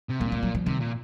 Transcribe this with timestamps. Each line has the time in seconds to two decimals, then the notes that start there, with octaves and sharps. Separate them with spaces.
0.09 C3
0.20 A#2 C4
0.32 A#3
0.43 F#3
0.55 F3
0.66 C3 D#3
0.81 A#2